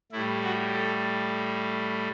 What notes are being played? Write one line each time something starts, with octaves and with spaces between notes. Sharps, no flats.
A2 G3 E4
F#4
A4